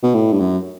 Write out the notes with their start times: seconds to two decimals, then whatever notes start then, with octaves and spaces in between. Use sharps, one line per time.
0.03 B2
0.15 A2
0.32 G2
0.40 F#2